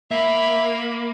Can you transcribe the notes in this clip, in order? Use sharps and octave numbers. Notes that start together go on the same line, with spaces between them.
A#3 E5 F5 B5